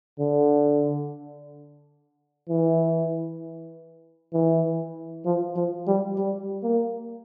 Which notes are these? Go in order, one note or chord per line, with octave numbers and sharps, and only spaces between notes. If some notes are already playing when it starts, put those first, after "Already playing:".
D3
E3
E3
F3
F3
G3
G3
A#3